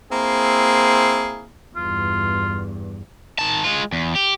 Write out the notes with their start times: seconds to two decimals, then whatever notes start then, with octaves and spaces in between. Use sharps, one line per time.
0.12 A#3 C4 E4 G#4
1.76 E2 G2 F4
3.39 D#3 A5
3.64 G#3 F4
3.92 E2
4.15 G4